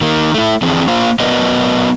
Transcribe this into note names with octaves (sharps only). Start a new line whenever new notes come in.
D#3 A#3
A3 E4
F2 D3 E3 C4 D4 G#4
A#3 F4 C5 F5
F#3 B3 A#4 B4 D5 D#5